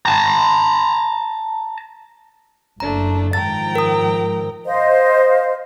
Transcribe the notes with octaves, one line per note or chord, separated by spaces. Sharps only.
A5 A#5
F#1 A3 D4 A#5
G#2 D#3 F3 G5 A#5 A6
A#4 D#6
C5 D#5 F5